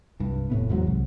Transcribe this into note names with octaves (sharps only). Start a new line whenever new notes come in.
C2 G2
F1 A2 B3
E2 G#2 E3 F#3
C2